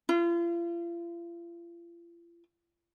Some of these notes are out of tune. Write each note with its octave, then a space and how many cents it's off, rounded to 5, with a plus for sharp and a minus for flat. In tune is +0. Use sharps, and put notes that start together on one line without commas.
F4 -40